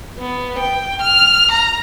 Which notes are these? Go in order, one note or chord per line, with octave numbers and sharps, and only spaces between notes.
B3
G5
F6
A#5